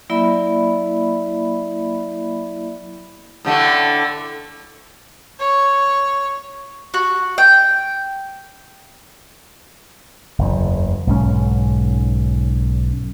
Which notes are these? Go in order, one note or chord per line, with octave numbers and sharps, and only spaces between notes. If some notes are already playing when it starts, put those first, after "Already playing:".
F#3 A#3 E4 D5 E5 B5
A2 D3 A3
C#5
F#4
G5
F#1 E2
B1 G#2 C#4